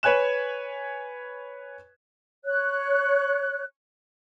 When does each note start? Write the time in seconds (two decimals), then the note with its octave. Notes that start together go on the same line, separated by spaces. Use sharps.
0.03 B4 C#5 G#5 F#6 E7
2.45 C#5 F#6